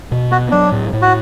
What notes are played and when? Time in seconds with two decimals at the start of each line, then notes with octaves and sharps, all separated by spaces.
0.12 B2
0.31 B3 F#4
0.51 F#3 D4
0.72 A2
0.93 A2
1.02 F#4